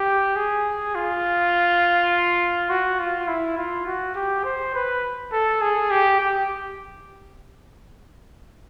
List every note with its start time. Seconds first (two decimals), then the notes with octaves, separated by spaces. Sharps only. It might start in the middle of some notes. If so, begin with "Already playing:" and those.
Already playing: G4
0.36 G#4
0.95 F4
2.70 F#4
2.99 F4
3.28 E4
3.58 F4
3.86 F#4
4.15 G4
4.45 C5
4.74 B4
5.32 A4
5.61 G#4
5.91 G4
6.20 G4